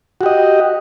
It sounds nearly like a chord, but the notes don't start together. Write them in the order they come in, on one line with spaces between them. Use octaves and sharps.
F#4 G4 D#5